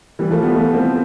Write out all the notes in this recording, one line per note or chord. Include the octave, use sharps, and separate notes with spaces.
E3 G3
F3 A3
G3 B3
F3 A3
A3 C4